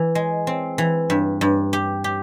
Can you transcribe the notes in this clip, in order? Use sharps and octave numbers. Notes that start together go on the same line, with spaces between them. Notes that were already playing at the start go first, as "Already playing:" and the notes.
Already playing: E3
G#3
C4
E3
G2
G2
G4
G4